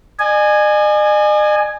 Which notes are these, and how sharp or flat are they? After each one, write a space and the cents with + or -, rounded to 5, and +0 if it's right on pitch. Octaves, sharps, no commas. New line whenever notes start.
D#5 -45 G#5 +0